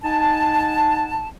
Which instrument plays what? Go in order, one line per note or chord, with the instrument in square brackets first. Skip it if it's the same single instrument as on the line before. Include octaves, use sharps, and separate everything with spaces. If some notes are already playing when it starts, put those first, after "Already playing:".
[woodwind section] D#4 F#5 G#5 A5